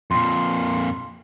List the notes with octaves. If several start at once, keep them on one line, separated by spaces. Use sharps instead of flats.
F2 A#2 C6